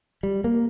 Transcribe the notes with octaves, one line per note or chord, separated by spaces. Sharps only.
G3
A#3